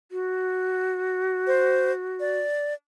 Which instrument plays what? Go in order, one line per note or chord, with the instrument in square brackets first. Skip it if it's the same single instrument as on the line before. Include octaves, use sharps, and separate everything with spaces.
[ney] F#4
[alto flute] C5
D5